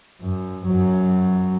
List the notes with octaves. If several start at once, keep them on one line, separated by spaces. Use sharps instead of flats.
F#2
F#2 F#3